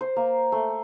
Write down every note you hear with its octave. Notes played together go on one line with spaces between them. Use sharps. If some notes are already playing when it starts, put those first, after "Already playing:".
C5
A#3
A3